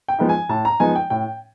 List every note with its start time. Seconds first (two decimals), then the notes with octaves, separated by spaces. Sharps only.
0.08 G5
0.19 F3 G#3 B3 D#4
0.29 G#5
0.49 A2 A5
0.65 A#5
0.80 F3 G#3 B3 D#4 G#5
0.96 G5
1.10 A2 G5